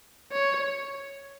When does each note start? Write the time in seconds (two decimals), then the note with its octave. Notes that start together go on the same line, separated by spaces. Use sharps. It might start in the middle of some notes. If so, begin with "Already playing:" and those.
0.32 C#5